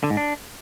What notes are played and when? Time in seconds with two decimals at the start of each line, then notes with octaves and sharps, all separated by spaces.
0.04 D3
0.10 G#2
0.17 D4